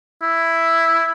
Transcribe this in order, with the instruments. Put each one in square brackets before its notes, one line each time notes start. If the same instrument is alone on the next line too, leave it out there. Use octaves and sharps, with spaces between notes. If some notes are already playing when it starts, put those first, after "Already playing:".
[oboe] E4